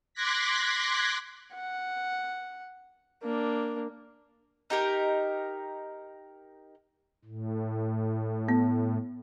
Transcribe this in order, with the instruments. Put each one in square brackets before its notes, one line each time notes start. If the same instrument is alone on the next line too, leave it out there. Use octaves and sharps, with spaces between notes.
[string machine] C6 D6 F#6 G#6 A#6 B6
[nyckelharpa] F#5
A#3 D4
[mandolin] D#4 G4 A#4
[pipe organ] A2
[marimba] B3